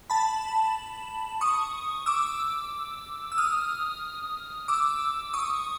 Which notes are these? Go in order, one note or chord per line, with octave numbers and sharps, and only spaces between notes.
A5 B5
C#6 D#6
D6 E6
E6
D#6 F6
D6 E6
C#6 D#6